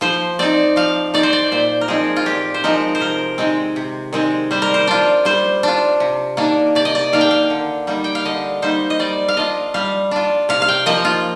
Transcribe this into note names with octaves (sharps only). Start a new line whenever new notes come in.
F3 C5
C4 D#4 D5
F3 F5
C4 D#4 D5
C5
D5
A#2 C5
A#4
F3 G#3 C4 D#4 G#4
F4
A#2 G4
C5
F3 G#3 C4 D#4 A#4
C5
C3 A#4
D#3 G#3 C4
C3
D#3 G#3 C4
G3 C5
A#4
C5
D4 F4
G3 C5
D4 F4
C3
D#3 A#3 D4
C3 D5
D#5
D5
D#3 A#3 D4 F5
G5
F5
D3
G3 A#3 D#4
G5
F5
D3 D#5
G3 A#3 D#4 C5
D#5
G3 D5
F5
D4 F4 D#5
G3 F5
D4 F4
C3 F5
F5
G5
F3 A#3 D#5
F4